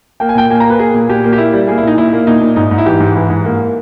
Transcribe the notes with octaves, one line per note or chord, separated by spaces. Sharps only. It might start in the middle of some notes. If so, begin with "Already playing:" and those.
A#3 G5
G#5
A#2 G5
A#3 G#5
A#5
A#3
B4
A#3 G#4
A#2
A#2 G4
A#3
G4
A#3 E4
G3
A#3 G#4
E4
A#2 D#4
A#2 E4
A#3
A#2 D#4
A#2
G#2 D#4
G#2
E4
E3 G4
G#2
E3 E4
G#2
A#3